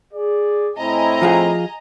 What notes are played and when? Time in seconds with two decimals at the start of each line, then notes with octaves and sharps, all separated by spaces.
0.13 G#4 D5
0.78 A2 C4 E4 D#5 G#5 A#5
1.22 F3 F4 G#4